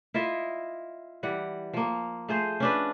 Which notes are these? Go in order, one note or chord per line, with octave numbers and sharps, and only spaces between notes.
E4 F4 D#5 E5
E3 G3 F#5
F3 A#3
A3 F4 G#4 C5
C#4 D4 B4